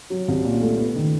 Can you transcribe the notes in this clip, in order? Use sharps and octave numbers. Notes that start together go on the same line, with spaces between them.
F#3
C2
A#2
A3
B3
D#3